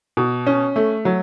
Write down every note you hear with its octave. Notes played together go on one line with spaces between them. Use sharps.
B2
C#4
A3
F#3